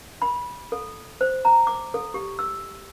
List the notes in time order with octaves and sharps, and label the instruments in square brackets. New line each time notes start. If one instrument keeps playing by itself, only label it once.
[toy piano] B5
A4
C5
A#5
D6
A4
G4
E6